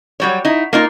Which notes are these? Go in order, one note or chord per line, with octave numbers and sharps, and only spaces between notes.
F#3 G3 C#5
D#4 E4
A#3 D#4 F4